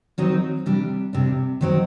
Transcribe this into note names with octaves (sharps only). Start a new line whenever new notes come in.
D#3 F#3 C4 D#4
C3 G3 D4
C3 G3 D4
D#3 F#3 C4